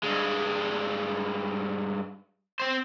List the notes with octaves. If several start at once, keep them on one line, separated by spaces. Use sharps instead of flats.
G2 G#3
C4 C5